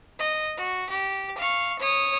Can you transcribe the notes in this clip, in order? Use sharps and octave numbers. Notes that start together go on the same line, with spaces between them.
D#5
F#4
G4
F5 C#6
C#5 D#6